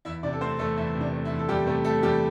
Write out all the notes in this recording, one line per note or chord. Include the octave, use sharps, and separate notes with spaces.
E2 E4 E5
C3 D4 D5
A4
A3 C4 C5
E2 A3 A4
E2 E4
C3
D4
A3
E4
E2
A4
E2 G3 G4
C3 A3 A4
A3 A4
E2 G3 G4